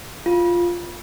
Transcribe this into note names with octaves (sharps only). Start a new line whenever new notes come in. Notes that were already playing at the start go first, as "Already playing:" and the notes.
F4